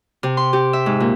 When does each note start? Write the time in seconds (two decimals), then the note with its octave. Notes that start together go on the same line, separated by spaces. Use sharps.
0.23 C3
0.37 C6
0.53 G4
0.73 E5
0.86 G#2
1.00 A#2